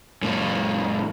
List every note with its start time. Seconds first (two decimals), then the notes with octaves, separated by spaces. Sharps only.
0.22 F#2 A#2